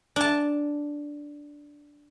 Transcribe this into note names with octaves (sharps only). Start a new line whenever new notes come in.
D4 A5